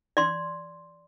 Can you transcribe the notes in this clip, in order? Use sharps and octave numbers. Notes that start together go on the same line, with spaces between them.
D5 C6